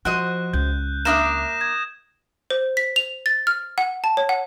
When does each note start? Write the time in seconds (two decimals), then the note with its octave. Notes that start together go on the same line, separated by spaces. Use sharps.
0.05 F3 F#4 C5 D#5 F#6
0.53 C#2 G6
1.05 A#3 D4 E5 D#6 A#6 E7
1.61 G#6
2.50 C5
2.77 B6
2.96 F7
3.26 A6
3.47 F6
3.78 F#5
4.04 A5
4.17 C#5
4.29 F#5